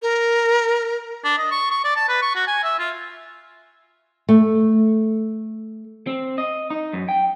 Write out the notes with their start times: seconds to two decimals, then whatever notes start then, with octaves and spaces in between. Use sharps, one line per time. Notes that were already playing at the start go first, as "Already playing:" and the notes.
0.02 A#4
1.24 D4
1.38 D#5
1.51 C#6
1.71 C#6
1.84 D5
1.96 A5
2.08 B4
2.22 C#6
2.36 F#4
2.48 G#5
2.64 E5
2.79 F4
4.29 A3
6.07 C4
6.38 D#5
6.70 D#4
6.93 F#2
7.09 G5